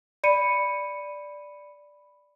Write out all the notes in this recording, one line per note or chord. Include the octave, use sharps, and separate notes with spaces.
D5 B5 C#7 D#7